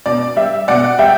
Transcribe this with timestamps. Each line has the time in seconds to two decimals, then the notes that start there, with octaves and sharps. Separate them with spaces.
0.06 B2 D5
0.36 G3 E5
0.68 B2 D5 F#5
0.98 G3 E5 G5